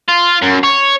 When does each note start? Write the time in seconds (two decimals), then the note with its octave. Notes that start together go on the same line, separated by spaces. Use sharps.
0.08 F4
0.42 F#2
0.63 C#5